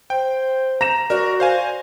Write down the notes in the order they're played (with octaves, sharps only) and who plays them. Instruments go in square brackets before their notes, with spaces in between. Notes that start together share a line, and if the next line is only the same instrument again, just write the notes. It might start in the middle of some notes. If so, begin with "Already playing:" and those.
[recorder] C5 [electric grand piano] G5
[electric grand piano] A#5 [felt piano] A#6 E7
[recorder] F#4 [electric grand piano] A#4 [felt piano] D5
[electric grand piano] C5 F5 G#5